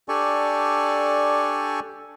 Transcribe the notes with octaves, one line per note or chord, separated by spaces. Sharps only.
D4 G4 A4 D5 G#5 C#6